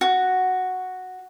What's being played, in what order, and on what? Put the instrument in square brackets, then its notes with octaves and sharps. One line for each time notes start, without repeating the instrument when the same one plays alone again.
[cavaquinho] F#4